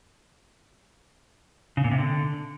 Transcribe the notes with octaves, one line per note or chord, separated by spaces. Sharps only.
C#3
A#2
C3
D3